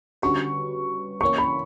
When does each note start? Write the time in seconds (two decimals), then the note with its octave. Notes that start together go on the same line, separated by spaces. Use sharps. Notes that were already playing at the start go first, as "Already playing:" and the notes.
0.22 D3 G3 C#4 F#4 B4 C#6
1.21 E3 A#3 C#4 C#6
1.38 B5